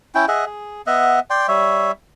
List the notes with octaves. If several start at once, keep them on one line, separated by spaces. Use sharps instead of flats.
C#4 E4 G5
G#4 D#5 E5 F#5
G#4
B3 D#5 E5 F#5
D5 G5 C6
G3 C#5 E5